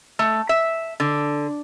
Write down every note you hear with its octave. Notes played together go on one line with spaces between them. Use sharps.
A3
E5
D3